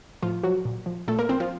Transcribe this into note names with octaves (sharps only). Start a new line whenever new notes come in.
A2 F3 F4
F3 F#3 F#4
A#2
F3
A#2 A3 A4
A#3 A#4
F3 C4 C5
F3 F4